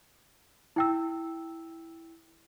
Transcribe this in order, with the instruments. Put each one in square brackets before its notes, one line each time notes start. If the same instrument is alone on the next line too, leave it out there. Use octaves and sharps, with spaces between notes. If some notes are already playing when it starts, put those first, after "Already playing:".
[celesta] E4 G5 E6